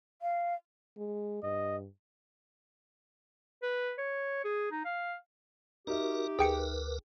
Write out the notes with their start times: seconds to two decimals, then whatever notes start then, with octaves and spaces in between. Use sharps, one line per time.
0.22 F5
0.98 G#3
1.43 G2 D#5
3.62 B4
3.98 C#5
4.44 G#4
4.72 D#4
4.85 F5
5.87 D#4 F#4 G4 A#4 E5
6.39 D2 G#4 A#4 B4 G5 C#7